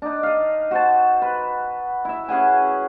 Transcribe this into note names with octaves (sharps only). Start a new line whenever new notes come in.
D4 D#4
D#5 F5
F#4 C5 A5
B4
E4 E5
C#4 G#4 F#5 G#5